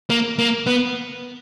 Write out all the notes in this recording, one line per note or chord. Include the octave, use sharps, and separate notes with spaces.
A#3
A#3
B3